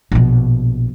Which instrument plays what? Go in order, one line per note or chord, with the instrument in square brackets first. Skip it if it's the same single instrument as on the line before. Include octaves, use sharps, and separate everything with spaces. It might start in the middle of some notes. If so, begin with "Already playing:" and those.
[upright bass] A#1 B2